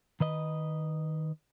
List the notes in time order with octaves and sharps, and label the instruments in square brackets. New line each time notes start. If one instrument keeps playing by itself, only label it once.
[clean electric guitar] D#3 B4 D#5